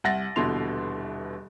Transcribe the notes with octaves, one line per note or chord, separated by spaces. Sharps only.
C2 F#5 A6 A#6
D#1 B2 D3 E3 C6 F7